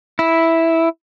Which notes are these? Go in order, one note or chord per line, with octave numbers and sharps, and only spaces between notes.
E4